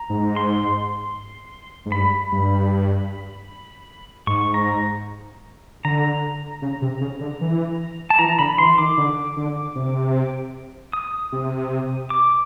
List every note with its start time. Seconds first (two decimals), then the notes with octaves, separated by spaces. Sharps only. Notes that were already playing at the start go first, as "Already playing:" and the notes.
Already playing: A#5
0.10 G#2
0.36 C6
1.86 G#2
1.92 G2 B5
2.32 G2
4.27 G#2 C#6
4.54 A#5
5.85 D3 A#5
6.62 C#3
6.82 C3
7.01 C#3
7.21 D3
7.41 E3
8.10 A5
8.19 E3 A#5
8.39 D3 B5
8.58 E3 C6
8.78 D#3 D6
8.97 D3
9.37 D3
9.75 C3
10.93 D#6
11.32 C3
12.10 D6